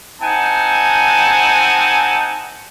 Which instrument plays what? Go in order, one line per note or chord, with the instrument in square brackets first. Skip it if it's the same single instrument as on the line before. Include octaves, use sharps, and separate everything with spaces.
[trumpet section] C4 D#4 F#5 G#5 A5